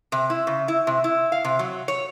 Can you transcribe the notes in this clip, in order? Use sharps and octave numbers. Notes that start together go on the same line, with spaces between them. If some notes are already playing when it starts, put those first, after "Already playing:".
C3
E4
C#3
E4
C3
E4
F5
C3
F#3
C#5